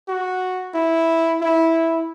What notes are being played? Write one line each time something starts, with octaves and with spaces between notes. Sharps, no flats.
F#4
E4
E4